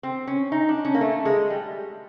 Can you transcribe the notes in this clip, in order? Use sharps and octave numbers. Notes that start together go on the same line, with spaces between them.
C4
C#4
D#4
D4
C#4
A#3
A3
G#3
G3